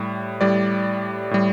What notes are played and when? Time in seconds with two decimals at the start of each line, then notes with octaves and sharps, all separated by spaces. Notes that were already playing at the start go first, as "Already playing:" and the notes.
Already playing: A2 G3
0.41 A2 G3 D5
1.31 A2 G3